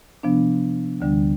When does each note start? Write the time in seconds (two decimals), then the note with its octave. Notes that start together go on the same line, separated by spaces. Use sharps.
0.23 C3 F3 B3 D4
1.01 D2 D3 G3 D4